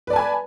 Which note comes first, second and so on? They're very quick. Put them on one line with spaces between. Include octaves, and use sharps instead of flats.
B4 D5 A5 G#5 B5